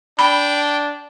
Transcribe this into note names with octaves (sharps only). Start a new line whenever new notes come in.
D4 G5 B5